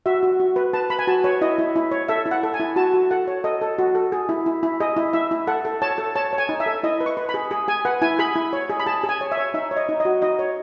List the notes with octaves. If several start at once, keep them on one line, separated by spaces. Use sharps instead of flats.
F#4 E5
F#4
F#4
B4
B4 A5
B4 B5
G#5
F#4 A5
B4 C#5
E4 D#5
E4
E4
C#5
A4 E5
E4
F#5
A4
G#5
E4
F#4 A5
F#4
A4 F#5
C#5
A4 D#5
A4
F#4
A4
G#4
E4
E4
E4
G#4 D#5
E4
E4 E5
E4
A4 F#5
A4
C#5 A5
A4
C#5 A5
C#5
G#5
D#4
E5
A4
E4 D#5
B4
C#6
B4
B5
G#4
G#4
G#4 G#5
B4 F#5
E4 G#5
G#4 B5
E4
C#5
G#4
B5
G#4 A5
G#4
G#5
C#5
E5
C#5
D#4 E5
C#5
D#5
D#4
D#5
F#4
D#4 D#5
C#5